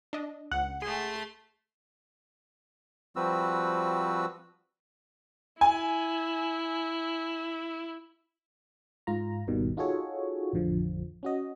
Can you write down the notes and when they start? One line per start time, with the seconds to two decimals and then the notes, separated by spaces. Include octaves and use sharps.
0.13 D4 D#5
0.51 C#2 F#5
0.82 A3 G#4 C6
3.16 F3 G3 C4 F#4 B4 E6
5.61 E4 G#5
9.07 G#2 F4 A#5
9.47 G#1 D#2 B2 D#3 G3
9.77 D#4 F4 F#4 G#4 A4 C#5
10.53 A1 F2 D3 F3
11.23 C#4 F#4 D#5